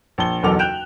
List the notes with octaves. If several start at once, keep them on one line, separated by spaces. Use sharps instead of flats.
A#1 A5 G7
F#1 B1 E2 A4 D6 F7
G5 F#6 G6 D7 E7 F7